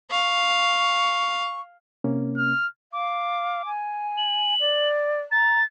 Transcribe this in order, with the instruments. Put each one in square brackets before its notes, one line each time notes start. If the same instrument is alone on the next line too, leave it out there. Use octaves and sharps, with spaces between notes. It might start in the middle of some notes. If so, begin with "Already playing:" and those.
[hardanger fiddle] F5 [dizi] C#6
[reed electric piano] C3 A#3 C#4
[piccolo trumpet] F6
[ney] F5 [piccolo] D6
[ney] G#5
[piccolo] F#7
[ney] D5
[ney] A#5 [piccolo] A6